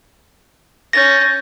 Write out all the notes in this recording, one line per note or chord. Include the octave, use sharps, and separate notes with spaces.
C#4 G6 A6 A#6